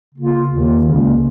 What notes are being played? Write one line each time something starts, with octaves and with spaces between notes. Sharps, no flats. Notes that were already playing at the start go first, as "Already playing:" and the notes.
C#3 A#3 F4
D#2 D#3 A#3 F4
C#2 C#3 A#3 C#4